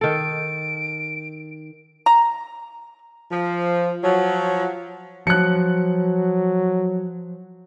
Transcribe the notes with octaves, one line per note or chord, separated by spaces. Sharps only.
D#3 A4 D7
A#5
F3
F3 F#3
F3 F#3 F#6 C#7